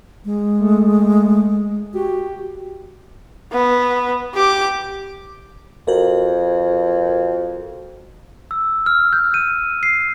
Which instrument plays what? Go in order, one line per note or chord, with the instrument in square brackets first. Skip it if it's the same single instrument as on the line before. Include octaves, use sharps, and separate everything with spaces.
[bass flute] G#3
[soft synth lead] A3
[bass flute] F#4 [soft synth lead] G4
[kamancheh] B3
G4 D6
[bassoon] F2 [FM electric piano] F#4 A#4
[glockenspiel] E6
F6
G6
D#7
C7